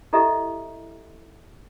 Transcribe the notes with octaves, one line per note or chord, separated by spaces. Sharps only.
E4 G4 A4 D#5 E5